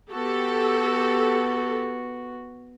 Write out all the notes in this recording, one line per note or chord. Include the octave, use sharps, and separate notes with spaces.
B3 F#4 G4 A4